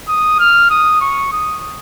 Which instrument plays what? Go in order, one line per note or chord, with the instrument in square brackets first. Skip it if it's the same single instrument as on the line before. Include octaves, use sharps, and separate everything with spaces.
[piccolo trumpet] D#6
F6
D#6
C#6
D#6